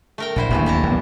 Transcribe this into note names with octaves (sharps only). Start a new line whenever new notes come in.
A3 A#4 G5
A#1 D3 E4 C5
D1 D#2 A2 C3 E3 D4
E4 A5 A#5
B1 E2 B3